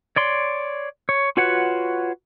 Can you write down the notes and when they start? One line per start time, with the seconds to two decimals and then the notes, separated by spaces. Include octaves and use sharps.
0.16 C#5 D5 C6
1.09 C#5
1.37 F4 F#4 B4 C#5 F#5